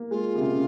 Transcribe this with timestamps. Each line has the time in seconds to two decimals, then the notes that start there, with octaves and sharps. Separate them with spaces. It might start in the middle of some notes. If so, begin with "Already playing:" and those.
Already playing: A#3
0.11 G#3 F4
0.35 C3
0.41 C#3